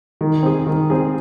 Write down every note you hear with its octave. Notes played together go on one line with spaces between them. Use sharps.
D#3
C4 G#4
D#3
C4 G#4